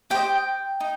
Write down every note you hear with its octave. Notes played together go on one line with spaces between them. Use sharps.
G4 C5 D#5 G5
D#4